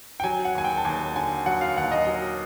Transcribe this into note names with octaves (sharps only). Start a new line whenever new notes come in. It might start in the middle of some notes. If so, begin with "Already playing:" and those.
G5
F#3 G#5
F#5
D#2 G#5
G5
A5
D#2 G#5
D3 G#5
F#3 F#5
F5
D#2 F#5
D#5
F#3